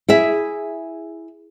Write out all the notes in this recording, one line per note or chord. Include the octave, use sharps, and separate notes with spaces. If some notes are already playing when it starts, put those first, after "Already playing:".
E4 G#4 E5